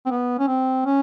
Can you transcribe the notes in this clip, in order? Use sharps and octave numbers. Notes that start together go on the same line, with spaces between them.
C4
B3
C#4
C4
C#4